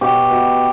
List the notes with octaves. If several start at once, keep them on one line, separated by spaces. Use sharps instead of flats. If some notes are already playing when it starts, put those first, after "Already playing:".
B2 G4
B2